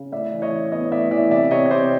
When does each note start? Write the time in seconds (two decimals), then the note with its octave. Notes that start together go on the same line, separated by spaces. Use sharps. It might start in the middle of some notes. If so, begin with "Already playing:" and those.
Already playing: C#3
0.12 A2 D5 E5
0.32 E3
0.42 C#5 D#5
0.52 E3
0.72 B3 C#5 D#5
0.91 A2 D5 E5
1.11 E3 D5 E5
1.31 C3 D5 E5
1.51 C3 C#5 D#5
1.66 C#5
1.71 C3 C5 D5